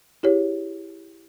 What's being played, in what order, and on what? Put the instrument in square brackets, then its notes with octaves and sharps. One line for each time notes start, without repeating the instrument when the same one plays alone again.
[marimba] E4 G4 G#4 C#5